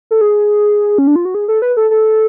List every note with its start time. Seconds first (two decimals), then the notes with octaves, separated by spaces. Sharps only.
0.11 A4
0.21 G#4
0.98 C#4
1.07 D4
1.16 F4
1.25 F#4
1.35 G#4
1.48 A4
1.62 B4
1.77 A4
1.91 A4